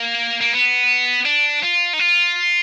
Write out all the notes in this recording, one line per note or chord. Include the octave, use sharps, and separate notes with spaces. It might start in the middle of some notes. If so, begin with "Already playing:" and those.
Already playing: A#3
A#3
B3
D4
F4
D#4
F4